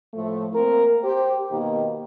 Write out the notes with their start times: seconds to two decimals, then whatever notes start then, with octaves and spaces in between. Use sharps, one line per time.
0.13 A2 F3 A3
0.54 A#3 C4 A#4
1.02 G4 C5
1.50 B2 D#3 A#3 D#4 G4